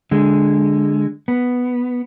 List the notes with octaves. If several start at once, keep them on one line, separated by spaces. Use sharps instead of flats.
D3 G#3
B3